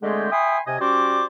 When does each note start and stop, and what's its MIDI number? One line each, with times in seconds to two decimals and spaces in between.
0.03 0.31 50
0.03 0.31 56
0.03 0.31 57
0.03 0.31 60
0.03 0.31 67
0.03 0.31 68
0.32 0.60 76
0.32 0.60 79
0.32 0.60 80
0.32 0.60 83
0.32 0.60 84
0.32 0.60 87
0.67 0.79 48
0.67 0.79 75
0.67 0.79 80
0.80 1.25 55
0.80 1.25 61
0.80 1.25 66
0.80 1.25 72
0.80 1.25 74
0.80 1.25 86